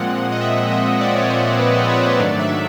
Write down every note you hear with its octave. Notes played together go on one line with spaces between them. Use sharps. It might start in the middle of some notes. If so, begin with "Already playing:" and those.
Already playing: A#2 F3 G#3 C4 F#5
D#5
E5
D#5
D5
C#5
C5
C5
B4
C5
C#5
D5
G#2 D#3 F#3 A3 D4 D5
E5